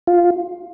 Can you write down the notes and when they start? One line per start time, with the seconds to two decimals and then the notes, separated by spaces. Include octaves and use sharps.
0.07 F4